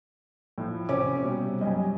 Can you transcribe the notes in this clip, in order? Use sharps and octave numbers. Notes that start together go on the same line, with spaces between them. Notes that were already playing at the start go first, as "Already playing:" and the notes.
A2 F3
C3 C#4 D6
B2 G3
F#2 G3 D#5 G#5